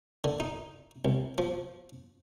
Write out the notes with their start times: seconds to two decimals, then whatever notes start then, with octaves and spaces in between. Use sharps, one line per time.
0.24 D3
0.40 D#4
1.05 C2
1.38 F3